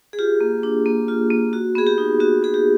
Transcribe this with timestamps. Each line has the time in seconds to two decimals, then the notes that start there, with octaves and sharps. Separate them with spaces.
0.13 G#4
0.19 F4 G4
0.41 A#3
0.63 D4
0.86 A#3
1.08 F4
1.30 A#3
1.53 F#4
1.75 B3 G#4
1.87 G4
1.98 D#4
2.20 B3 F#4
2.43 F#4 G#4
2.54 G4